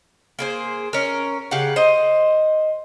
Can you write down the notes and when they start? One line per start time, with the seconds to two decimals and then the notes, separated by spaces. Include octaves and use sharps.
0.39 A#3 G#4 C5
0.93 C#4 A#4
1.51 C#3 G4 F5 F#5
1.76 C5 D#5